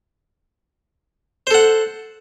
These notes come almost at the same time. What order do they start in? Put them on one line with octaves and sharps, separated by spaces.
C5 A4 F#5